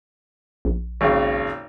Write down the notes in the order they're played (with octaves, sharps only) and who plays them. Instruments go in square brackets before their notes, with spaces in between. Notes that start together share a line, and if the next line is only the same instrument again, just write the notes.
[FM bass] A#1
[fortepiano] G#1 D#2 C#3